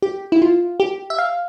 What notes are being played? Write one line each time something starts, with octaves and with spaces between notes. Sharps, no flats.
G4
E4
F4
G4
E5
F5